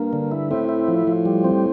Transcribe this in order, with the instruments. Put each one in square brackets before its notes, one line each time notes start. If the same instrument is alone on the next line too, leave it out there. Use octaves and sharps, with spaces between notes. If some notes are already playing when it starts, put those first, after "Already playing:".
Already playing: [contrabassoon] G2 [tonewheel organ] A#3
[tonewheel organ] D3
E4
[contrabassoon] A2 [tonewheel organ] C4
[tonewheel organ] E4
F3
F3
G3
C4